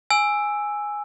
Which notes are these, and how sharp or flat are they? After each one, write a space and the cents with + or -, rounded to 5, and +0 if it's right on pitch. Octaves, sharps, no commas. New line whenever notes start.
G#5 +0 E6 +0